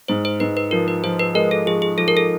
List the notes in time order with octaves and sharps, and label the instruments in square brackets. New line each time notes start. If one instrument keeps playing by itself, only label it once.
[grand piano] G#2 [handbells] C5
[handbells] C5
[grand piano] G#2 [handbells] B4
[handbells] B4
[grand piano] F3 [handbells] A#4
[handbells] B4
[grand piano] F3 [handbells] C5
[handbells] B4
[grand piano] G#3 [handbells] A#4
[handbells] A4
[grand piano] F3 [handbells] G#4
[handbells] G#4
[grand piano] F3 [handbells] A4
[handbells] A#4
A4